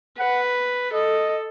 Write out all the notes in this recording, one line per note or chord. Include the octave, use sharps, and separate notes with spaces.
B4 F#5
A4 D#5